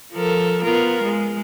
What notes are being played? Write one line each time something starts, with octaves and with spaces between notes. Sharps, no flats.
F3 A4 A#4
B3 F4 A#4
G#3